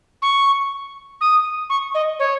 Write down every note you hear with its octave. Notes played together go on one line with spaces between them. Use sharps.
C#6
D#6
C#6
D#5
C#5